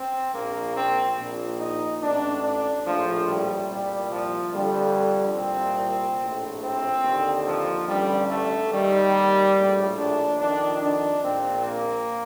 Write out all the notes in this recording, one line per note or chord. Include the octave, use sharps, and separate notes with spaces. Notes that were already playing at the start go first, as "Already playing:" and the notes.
Already playing: C4
A#1 A#2 A#3
C4
A#1 A#2
D#4
A1 A2 D4
D4
A#1 A2 F3
G3
C2 A#2 G3
F3
F2 D3 G3
C2 A#2 C4
A#1 A2
C4
D#2 D3
F3
A1 G2 D3 G3
A3
D#2 D#3 G3
A#1 A2
D4
F2 D#3 D4
D4
A#1 A#2 C4
A#3